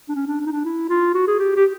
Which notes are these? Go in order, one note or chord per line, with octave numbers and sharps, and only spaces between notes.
D4
C#4
D4
D4
D#4
D4
E4
F4
F#4
G#4
G4
G4